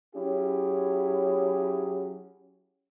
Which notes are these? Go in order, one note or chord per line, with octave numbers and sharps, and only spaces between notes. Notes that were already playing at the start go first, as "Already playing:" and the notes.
F#3 C#4 E4 G4 G#4